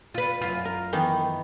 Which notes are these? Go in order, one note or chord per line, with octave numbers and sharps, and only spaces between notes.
F4 B4
F#2 F4
A#4
D#3 E3 B3